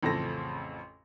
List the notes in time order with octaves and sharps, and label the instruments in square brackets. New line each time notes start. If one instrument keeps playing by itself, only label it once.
[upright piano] A1 F2 C#3 C4 A4 A#6